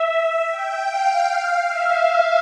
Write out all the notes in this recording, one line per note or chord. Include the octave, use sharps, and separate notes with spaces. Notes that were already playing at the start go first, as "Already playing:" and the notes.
Already playing: E5
G5
F5
E5